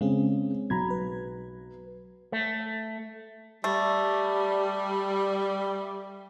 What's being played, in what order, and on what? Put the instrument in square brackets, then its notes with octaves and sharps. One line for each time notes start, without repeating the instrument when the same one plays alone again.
[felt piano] C#3 [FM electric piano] G#3 C4 G#4
[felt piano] B1 [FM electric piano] A#5 B5 G#6
[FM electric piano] B4
[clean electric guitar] A3
[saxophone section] G3 [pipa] A3